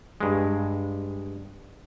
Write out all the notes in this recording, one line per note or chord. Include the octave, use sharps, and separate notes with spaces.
G2 G#3